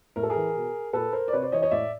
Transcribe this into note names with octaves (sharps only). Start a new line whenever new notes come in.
A2 A#4
A4
G#4 A#4
E3
B2
A#2 A4 B4
A#4 C5
D5
C3 B4 C#5
C5 D5
E3 C#5 D#5
C#5 D#5
A2 D5 E5